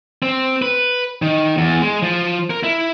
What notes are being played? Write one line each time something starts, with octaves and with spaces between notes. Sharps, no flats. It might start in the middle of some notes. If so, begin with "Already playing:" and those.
C4
B4
D#3
E2
G#3
F3
A#4
E4